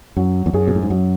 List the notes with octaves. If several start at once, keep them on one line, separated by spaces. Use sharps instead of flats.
F#2 F#3
E2
F#2 C#4 G#4
B2
A2
G#2
F#2 F#3